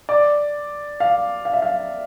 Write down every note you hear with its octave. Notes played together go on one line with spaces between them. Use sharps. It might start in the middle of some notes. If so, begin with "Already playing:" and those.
D5
F5
F5
E5
F5